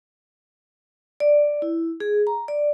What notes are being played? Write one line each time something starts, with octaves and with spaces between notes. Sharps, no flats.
D5
E4
G#4
A#5
D5